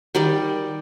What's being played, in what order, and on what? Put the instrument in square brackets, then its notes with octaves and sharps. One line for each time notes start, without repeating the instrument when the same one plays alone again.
[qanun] D#3 G3 D5 G5